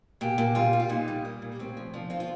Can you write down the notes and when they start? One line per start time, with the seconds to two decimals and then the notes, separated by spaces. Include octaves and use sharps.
0.21 A#2 G4
0.38 A#2
0.55 G3 F4
0.73 G3
0.80 F4
0.89 A#2 D#4
1.08 G3
1.25 A#3
1.42 A#2
1.59 A2 C4
1.77 F3
1.94 F3 D4
2.10 C4 F4
2.20 F4